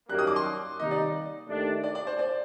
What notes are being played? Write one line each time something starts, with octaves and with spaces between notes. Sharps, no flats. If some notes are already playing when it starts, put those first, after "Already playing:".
F#2 D#3 G3 A#3 F#6
D#6
D6
C6
C3 D#3 G3 A#3 D#4 D#5
D5
D#2 D#3 A3 D4
D5
D5
C5
D5